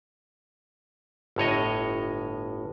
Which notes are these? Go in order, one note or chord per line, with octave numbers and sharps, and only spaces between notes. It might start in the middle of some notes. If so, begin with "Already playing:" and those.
G1 A2 C#5 D#5